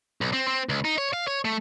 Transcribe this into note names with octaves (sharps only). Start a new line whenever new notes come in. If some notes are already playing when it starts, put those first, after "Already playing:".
B1
C4
C4
C#2
D#4
C#5
F5
C#5
A3